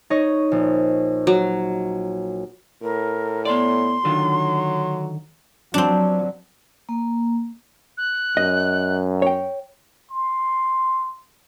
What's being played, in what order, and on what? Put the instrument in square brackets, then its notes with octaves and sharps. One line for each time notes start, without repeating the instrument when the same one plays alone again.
[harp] D#4 C#5 D#5
A#1
[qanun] F#3
[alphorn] A2 [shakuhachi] A#4
[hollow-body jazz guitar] B3 D5 [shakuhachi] C6
[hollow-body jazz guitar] D3 D#3 F4 [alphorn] F#3
[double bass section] F3 F#3 [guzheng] C4 D4
[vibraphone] A#3
[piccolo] F#6
[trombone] F#2 [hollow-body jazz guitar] D#5
[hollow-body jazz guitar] C#5 G5
[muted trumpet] C6